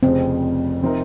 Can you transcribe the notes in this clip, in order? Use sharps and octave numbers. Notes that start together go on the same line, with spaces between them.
F1 F2 C#3 C4
C3 F3 C4 D#4 A#4